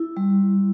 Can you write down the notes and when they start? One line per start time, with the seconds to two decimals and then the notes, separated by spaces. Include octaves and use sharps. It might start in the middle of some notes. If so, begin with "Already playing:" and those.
Already playing: E4
0.17 G3